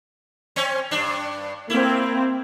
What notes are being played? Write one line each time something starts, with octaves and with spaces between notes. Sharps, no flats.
C4 C#4
G2 D4
A#3 C4 E4